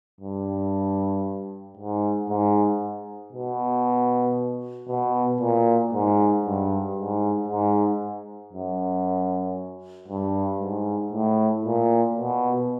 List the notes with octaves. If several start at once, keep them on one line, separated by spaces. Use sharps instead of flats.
G2
G#2
G#2
B2
B2
A#2
G#2
G2
G#2
G#2
F#2
G2
G#2
A2
A#2
B2